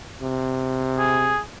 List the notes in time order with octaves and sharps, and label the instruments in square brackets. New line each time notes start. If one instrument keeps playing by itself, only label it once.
[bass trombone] C3
[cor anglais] G#4